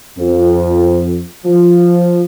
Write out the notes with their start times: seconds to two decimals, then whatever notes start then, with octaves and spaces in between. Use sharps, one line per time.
0.18 F2
1.45 F3